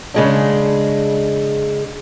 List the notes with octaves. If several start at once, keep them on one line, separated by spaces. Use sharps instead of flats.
C#3 G#3 D4